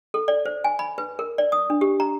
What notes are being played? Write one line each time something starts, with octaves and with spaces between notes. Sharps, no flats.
A4
D5
C5
G#5
B5
B4
A#4
D5
D#6
D4
G4
A#5